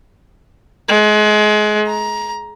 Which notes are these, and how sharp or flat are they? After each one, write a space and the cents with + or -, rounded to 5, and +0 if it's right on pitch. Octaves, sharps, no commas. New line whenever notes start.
G#3 +30
A#5 +20